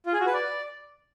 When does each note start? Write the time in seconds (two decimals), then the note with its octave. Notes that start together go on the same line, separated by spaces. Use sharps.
0.06 F4
0.13 G#4
0.20 F#4
0.27 B4
0.34 D5